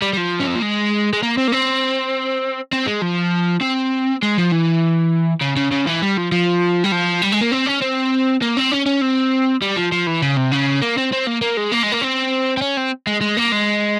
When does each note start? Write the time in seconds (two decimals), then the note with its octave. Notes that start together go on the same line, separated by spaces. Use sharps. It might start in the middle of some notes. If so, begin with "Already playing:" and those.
0.02 G3
0.13 G3
0.17 F3
0.40 C#4
0.47 C4
0.55 A#3
0.62 G#3
1.13 G#3
1.23 A#3
1.37 C4
1.48 A#3
1.52 C4
2.72 C4
2.86 G#3
3.02 F3
3.62 C4
4.23 G#3
4.38 F3
4.52 E3
5.41 C#3
5.57 C#3
5.72 C#3
5.87 E3
6.02 G3
6.18 F3
6.32 F3
6.84 G3
6.92 F3
7.22 G3
7.32 G#3
7.41 A#3
7.52 C4
7.67 C#4
7.82 C4
8.42 A#3
8.57 C4
8.72 C#4
8.86 C#4
9.02 C4
9.62 G3
9.77 F3
9.92 F3
10.07 E3
10.22 C#3
10.37 C3
10.52 C#3
10.82 A#3
10.97 C4
11.12 C4
11.27 A#3
11.41 A#3
11.57 G#3
11.72 A#3
11.83 G#3
11.92 A#3
12.02 C4
12.57 C4
12.62 C#4
12.77 C4
13.07 G#3
13.21 G#3
13.37 A#3
13.52 G#3